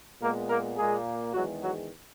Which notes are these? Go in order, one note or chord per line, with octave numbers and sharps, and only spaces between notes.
A#2 G#3 A#3 B3 A#4
A#3 A#4
A#2 G#3 A#3 G#4
E2 D#3 F#3 G#3 F#4
F#3 F#4